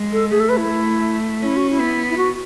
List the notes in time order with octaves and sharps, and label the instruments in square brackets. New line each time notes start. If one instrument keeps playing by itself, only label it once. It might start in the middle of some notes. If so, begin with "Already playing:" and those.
Already playing: [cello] G#3
[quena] A4
[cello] A3 [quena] G#4
[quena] A4
B4
E4
[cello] A3
[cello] C#4 [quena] E4
[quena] F#4
E4
[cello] B3
[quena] E4
F#4